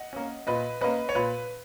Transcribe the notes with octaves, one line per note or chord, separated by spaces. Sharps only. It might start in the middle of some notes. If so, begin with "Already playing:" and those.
Already playing: D#5 F#5
A#3 C#4
A#2 B4 D#5
A#3 C#4 B4 D#5
C#5
A#2 B4